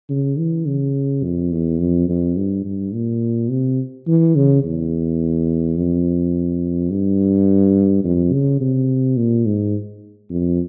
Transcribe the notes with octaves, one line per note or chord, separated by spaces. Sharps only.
C#3
E3
C#3
F2
E2
F2
F2
G2
G2
A#2
C3
E3
C#3
E2
F2
G2
F2
C#3
C3
A#2
G#2
F2